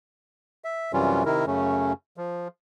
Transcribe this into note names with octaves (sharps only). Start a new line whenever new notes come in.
E5
F#2 C3 E3 G3 C#4 F4
C3 D#3 E4 A#4
F#2 C#3 A3 C#4
F3